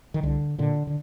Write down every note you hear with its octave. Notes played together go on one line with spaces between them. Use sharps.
D#3
C2 D3
A#2 D3
D3